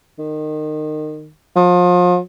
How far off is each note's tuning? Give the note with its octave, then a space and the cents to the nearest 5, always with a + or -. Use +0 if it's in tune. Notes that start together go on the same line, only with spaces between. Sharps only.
D#3 -25
F3 +35